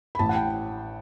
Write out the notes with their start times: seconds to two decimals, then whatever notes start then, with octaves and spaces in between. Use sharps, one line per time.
0.15 B5
0.19 A1 A5
0.29 F#5
0.35 G5